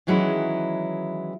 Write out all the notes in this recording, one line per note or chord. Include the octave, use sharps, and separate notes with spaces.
D#3 E3 F#3 G#3 C#4 E4